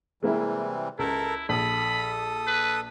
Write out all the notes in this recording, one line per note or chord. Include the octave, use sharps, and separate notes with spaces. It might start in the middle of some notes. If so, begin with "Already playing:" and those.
C3 E3 G3 G#3 A#3 E4
C#2 E4 A4 A#4
A#1 A4 B5 D#6
B4